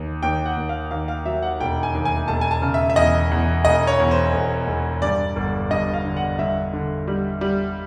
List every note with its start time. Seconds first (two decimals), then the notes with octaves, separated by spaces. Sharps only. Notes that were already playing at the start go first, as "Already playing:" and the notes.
Already playing: D#2
0.23 D#2 G5
0.46 F#5
0.57 D#2
0.69 F5
0.91 D#2 F5
1.08 F5
1.25 F#3 E5
1.43 F#5
1.60 E1 G5
1.83 G#5
1.95 D#2
2.05 G#5
2.28 E1 A5
2.41 G#5
2.51 A5
2.62 C#3
2.74 E5
2.90 E5
2.96 E2 D#5
3.32 E2
3.65 E1 D#5
3.87 C#5
4.00 E2
4.11 C5
4.34 E1
4.68 E1
5.02 G2 D5
5.36 G1
5.70 G2 D#5
5.94 F5
6.05 D3
6.16 F#5
6.39 G2 E5
6.73 D3
7.07 G3
7.41 G3